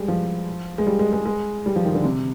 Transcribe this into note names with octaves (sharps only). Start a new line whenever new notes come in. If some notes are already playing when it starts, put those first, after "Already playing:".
Already playing: G3 G#3
F3
G#3
G3
G#3
G#3
G#3
G3
F3
D#3
D3
C3